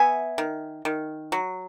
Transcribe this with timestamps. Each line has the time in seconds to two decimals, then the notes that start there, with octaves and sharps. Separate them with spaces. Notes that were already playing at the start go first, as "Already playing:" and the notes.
Already playing: B3 E5 G#5
0.38 D#3
0.85 D#3
1.32 F#3